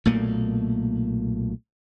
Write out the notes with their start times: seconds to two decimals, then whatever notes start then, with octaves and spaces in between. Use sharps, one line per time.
0.05 B1 A#2 A3 A#3